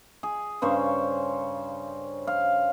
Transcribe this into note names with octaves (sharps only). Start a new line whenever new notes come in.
G#4
G2 C#3 C5 C#5
F5